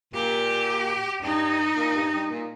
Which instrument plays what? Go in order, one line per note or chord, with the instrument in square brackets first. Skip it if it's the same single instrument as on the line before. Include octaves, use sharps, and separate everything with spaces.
[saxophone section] A#2 [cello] G4
[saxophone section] G2 [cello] D#4
[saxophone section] A#2
G2
G2
A#2